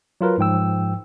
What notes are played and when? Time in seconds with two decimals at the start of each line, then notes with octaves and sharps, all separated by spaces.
0.21 F#3 F4 A#4 B4
0.38 G#2 F3 G5 E6